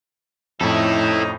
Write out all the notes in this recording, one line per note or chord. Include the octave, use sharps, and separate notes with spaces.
F2 A2 C3 C#4 D#4 E4 A4